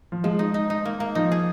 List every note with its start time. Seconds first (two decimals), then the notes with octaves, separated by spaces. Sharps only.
0.12 F3
0.24 F3 G#3
0.39 D#4
0.54 D#4
0.70 D#4
0.85 A#3
1.00 A#3
1.15 F3 D#4
1.32 G#4